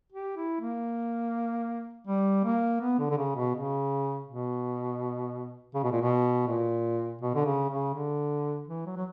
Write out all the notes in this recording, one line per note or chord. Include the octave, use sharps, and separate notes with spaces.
G4
E4
A#3
G3
A#3
B3
D3
D3
C#3
B2
C#3
B2
C#3
B2
A#2
B2
A#2
B2
D3
C#3
C#3
D3
E3
F#3
F#3